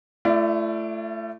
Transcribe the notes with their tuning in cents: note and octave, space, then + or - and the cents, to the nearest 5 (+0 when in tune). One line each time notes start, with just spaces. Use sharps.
A3 +0 E4 +45 D5 +0